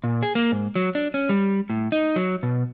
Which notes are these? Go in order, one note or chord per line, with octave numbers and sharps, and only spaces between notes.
A#2
G#4
A#3
G#2
F#3
D4
C#4
G3
A2
D#4
F#3
B2